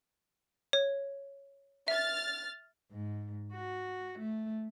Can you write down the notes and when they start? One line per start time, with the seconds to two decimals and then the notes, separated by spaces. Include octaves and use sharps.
0.73 C#5
1.88 E5 F6 A6
2.92 G#2
3.53 F#4
4.19 A3